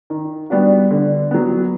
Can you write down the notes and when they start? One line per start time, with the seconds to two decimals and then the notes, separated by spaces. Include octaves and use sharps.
0.10 D#3
0.50 G3 B3 D4 F#4
0.91 D3
1.31 F#3 B3